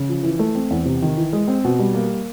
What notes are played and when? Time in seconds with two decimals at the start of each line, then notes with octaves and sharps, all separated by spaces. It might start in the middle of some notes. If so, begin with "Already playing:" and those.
Already playing: C#3
0.09 F3
0.23 E3
0.39 A3
0.55 C4
0.70 E2
0.86 C3
1.02 D#3
1.17 E3
1.33 G#3
1.48 C4
1.64 B2
1.79 G3
1.94 A#3